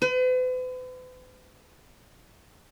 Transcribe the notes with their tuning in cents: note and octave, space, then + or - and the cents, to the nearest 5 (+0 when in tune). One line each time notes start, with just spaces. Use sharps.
B4 +45